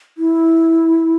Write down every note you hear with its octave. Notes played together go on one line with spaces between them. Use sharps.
E4